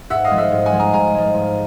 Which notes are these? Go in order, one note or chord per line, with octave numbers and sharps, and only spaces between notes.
G#2 E5 F#5
D#5 F5
F3 G#3
E5 F#5
G#2
F#5 G#5
F3 G#3
G#5 A#5
G#2 G#5 A#5
F3 G#3
G#2